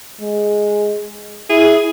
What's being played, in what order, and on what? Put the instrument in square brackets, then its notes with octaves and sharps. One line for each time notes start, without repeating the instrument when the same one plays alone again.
[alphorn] G#3
[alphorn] E4 [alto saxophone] G#4